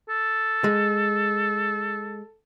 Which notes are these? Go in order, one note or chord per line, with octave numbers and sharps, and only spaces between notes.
A4
G#3